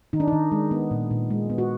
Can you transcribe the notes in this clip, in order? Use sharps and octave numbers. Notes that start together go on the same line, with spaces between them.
D#3 D#4
D4
D#3 D#4
G#3
B3
A#2
A#2
G#3
B3
F#4